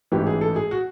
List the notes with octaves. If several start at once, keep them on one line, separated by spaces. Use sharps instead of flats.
A1 G#2 E3 G4
G#4
A4
G#4
F#4